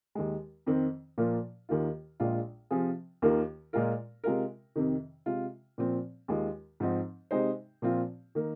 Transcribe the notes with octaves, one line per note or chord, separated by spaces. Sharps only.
D#2 D#3 G#3
F2 D#3 C4
A#2 F3 A#3 F4
D#2 D#3 A#3 F4
A#1 A#2 G#3 F4
C3 F3 C4 F4 G#4
D#2 D#3 A#3 F4 A#4
A#2 G#3 F4 A#4
C3 G#3 F4 A#4
F2 C3 D#3
C3 G#3 F4
A#2 F3 C4
D#2 D#3 G#3 F4
G#2 F3 C4 D#4
C3 G#3 D#4 C5
A#2 F3 C4 F4
D#3 A#3